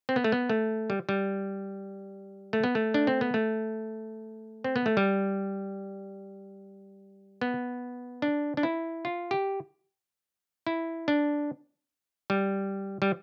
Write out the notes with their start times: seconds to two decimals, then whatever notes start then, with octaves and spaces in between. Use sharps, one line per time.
0.09 C4
0.16 B3
0.24 A3
0.32 B3
0.49 A3
0.90 G3
1.09 G3
2.53 A3
2.64 B3
2.75 A3
2.94 D4
3.07 C4
3.21 B3
3.34 A3
4.64 C4
4.76 B3
4.86 A3
4.97 G3
7.41 B3
8.22 D4
8.57 D4
8.63 E4
9.05 F4
9.31 G4
10.67 E4
11.08 D4
12.30 G3
13.02 G3